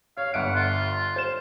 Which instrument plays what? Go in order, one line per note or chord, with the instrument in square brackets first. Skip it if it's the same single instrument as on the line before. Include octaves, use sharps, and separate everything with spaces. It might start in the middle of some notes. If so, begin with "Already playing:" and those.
[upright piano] C#5 [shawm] F5
[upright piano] G1 E5 D7 [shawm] F#5
[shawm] F4
[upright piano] C5 E7